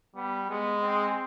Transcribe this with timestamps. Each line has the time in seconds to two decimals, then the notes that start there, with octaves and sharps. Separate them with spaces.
0.16 G3 B3
0.50 G#3 B3
0.83 C4